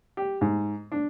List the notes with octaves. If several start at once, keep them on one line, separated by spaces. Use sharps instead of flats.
G4
G#2
D4